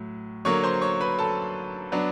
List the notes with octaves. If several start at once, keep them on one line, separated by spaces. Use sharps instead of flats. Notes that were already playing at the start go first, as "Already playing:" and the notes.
Already playing: A2 F#3
D3 F#3 A#3 C#5 C#6
C5 C6
C#5 C#6
B4 B5
A4 A5
F#3 B3 D4